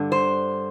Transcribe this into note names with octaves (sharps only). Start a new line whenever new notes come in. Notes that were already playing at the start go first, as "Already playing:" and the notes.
Already playing: G2 D3
C5